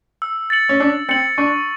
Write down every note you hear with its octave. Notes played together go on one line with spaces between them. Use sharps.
E6
A6 C#7 F#7
C#4
D4 E6
C4 A6 C#7 F#7
D4 C#6